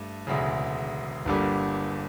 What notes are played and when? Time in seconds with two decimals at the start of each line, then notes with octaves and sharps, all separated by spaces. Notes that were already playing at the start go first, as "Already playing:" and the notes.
Already playing: G2 A3
0.27 E1 D2 C#3
1.26 G1 G2 D3 G3 A#3